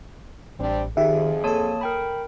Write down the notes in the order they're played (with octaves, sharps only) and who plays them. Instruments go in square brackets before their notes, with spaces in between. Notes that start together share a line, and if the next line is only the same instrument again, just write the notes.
[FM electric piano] A1 [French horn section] G3 C4 D4
[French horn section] F2 G#4 [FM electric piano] D#3 G4 [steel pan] E5
[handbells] A#3 C#5 A5 [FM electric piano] A4 D#6
[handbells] A#4 G5 B5